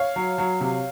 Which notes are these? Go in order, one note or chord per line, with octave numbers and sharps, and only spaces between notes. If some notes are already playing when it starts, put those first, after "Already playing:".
Already playing: C#5 F5
F#3
F#3
C3